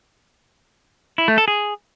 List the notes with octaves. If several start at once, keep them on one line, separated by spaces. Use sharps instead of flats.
E4
A3
A4
G#4